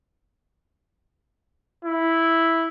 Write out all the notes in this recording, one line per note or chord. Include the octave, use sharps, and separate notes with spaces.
E4